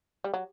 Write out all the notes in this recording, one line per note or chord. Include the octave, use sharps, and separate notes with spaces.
G3
F#3